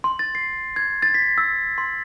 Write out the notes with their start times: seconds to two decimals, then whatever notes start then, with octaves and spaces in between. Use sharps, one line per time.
0.04 C6
0.19 A6
0.35 C7
0.76 G#6
1.02 A6
1.14 B6
1.38 E6
1.78 C6